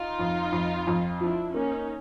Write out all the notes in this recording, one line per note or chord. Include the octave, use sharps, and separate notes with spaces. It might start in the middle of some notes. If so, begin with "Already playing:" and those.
Already playing: D#4 F4
F2
F2
F2
F3 D4 E4
A#3 C#4 D#4